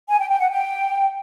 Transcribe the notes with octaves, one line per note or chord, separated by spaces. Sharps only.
G#5
G5
G5
F#5
G5